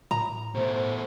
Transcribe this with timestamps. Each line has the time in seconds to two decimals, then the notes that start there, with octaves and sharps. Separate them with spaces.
0.11 A2 A#5
0.55 B2 A3 C5